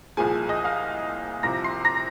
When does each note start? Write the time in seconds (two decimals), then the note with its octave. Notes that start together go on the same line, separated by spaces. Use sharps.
0.17 C2 A#2 F3 G#4 G#5
0.49 D#5 D#6
0.64 F5 F6
1.43 C2 C3 F3 A#5 A#6
1.64 C6 C7
1.85 A#5 A#6